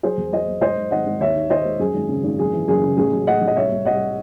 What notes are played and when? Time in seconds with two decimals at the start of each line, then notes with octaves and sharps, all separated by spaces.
0.03 F#3 G#4 C5
0.17 E2
0.32 F#3 C5 D#5
0.47 F#3
0.61 G#2 C5 D#5
0.76 G#2
0.91 G#1 D#5 F#5
1.06 G#1
1.21 D#2 C#5 E5
1.35 D#3
1.50 D#3 C5 D#5
1.65 G#3
1.79 F#2 G#4
1.94 G#1
2.09 C#3
2.24 G#1
2.39 F#1 G#4
2.53 E3
2.68 F#1 G#4
2.83 C#3
2.97 A1 G#4
3.12 F#3
3.27 A2 D#5 F#5
3.41 A1
3.47 D#5
3.56 C2 C#5 E5
3.72 C2
3.85 C2 D#5 F#5